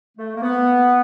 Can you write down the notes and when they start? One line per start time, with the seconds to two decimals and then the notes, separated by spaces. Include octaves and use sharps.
0.17 A3
0.35 A#3
0.43 B3